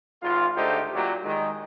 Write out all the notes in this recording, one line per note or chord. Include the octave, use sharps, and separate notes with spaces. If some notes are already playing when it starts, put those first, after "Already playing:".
G#1 F4
G#2 D3 A3 D#4 G4 C5
A#2 F#3 G4
D#3 G#3